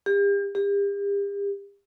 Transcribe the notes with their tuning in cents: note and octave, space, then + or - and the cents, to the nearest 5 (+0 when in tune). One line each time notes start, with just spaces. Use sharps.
G4 +40
G4 +40